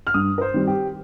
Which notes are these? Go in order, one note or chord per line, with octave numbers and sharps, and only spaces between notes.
F6
G2 D#6
A#4
C5
D#3 G3 C4
G4